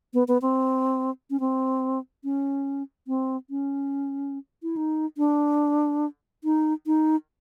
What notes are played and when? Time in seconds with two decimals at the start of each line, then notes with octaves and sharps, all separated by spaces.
0.14 B3
0.28 B3
0.42 C4
1.30 C#4
1.40 C4
2.24 C#4
3.07 C4
3.50 C#4
4.63 E4
4.76 D#4
5.18 D4
6.44 D#4
6.87 D#4